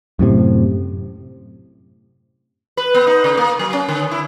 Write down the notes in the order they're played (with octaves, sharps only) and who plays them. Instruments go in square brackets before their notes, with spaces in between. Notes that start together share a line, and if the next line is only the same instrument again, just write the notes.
[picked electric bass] F#2 A2 C3
[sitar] B4
B3
D#4
C#3
A#3
F#3
C#4
D3
E4